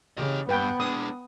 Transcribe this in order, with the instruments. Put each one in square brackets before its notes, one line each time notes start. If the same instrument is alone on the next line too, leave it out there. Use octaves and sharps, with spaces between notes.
[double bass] C#3 [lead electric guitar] G4 D#5
[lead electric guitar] G2 [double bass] B3 [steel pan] B4 G5
[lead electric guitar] G#3 D4 [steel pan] D#6